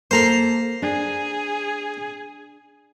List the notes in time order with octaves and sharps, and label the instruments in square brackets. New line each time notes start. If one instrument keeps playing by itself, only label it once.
[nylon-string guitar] A#3 A4 [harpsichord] C5 A#5 C6
[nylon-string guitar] D4 [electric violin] G#4